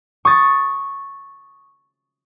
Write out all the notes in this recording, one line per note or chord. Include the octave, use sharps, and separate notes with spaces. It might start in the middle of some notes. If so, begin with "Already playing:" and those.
C#6 D#6 A6